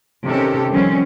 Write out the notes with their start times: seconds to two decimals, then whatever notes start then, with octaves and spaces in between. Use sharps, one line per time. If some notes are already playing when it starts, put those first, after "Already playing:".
0.25 C3 D#3 C#4 G4 A4 A#4
0.70 D#3 F3 G3 C4 C#4